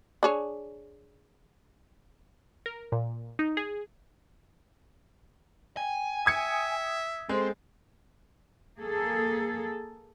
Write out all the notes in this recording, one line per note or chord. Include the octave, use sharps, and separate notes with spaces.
D4 G#4 C#5
A#4
A#2
D#4
G#4
G5 G#5
E5 D#6 G#6 C#7
G#3 C4 A4 C5 C6
A#3 G#4 A4